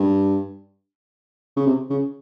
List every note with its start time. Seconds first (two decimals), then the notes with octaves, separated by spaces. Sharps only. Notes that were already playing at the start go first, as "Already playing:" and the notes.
Already playing: G2
1.57 C#3
1.66 C3
1.90 C#3